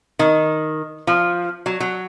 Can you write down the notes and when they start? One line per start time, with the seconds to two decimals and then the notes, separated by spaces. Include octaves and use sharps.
0.19 D#3
1.07 F3
1.66 F#3
1.80 F#3